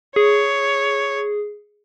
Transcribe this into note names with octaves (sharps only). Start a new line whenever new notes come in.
G#4 C#5